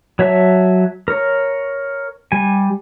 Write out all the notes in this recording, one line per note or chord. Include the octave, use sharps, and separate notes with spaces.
F#3 C#5 E5 A5
A#4 C#5
G3 G#5